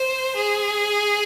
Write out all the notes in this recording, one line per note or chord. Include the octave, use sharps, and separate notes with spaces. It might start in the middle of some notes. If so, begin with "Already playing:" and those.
Already playing: C5
G#4